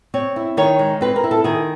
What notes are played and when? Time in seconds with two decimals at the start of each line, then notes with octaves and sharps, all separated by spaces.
0.14 C4 C#5
0.36 E4
0.57 D#3 C#5
0.79 G#3
1.01 C4 B4
1.16 A#4
1.24 E4
1.31 A4
1.44 D#3 G#4